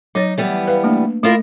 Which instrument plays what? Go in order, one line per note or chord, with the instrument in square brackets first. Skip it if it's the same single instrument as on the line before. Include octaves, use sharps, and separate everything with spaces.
[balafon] F#3 C#5 D#5 [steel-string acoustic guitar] D#4
[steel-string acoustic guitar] E3 G3 B3
[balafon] B4 F5
A3 A#3 D4
[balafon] A3 [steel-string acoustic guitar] E4 F4 A#4